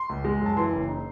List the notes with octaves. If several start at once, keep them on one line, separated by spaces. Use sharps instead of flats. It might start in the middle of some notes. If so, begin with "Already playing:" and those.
Already playing: C6
C#2
G#3
F#2
A5
E3 C6
F#1
D#4